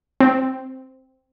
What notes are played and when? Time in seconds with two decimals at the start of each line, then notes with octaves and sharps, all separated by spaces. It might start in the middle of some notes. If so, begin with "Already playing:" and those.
0.21 C4